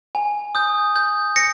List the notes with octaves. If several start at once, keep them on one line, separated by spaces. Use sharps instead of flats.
G#5
D#6 G6
G6
A#6 C#7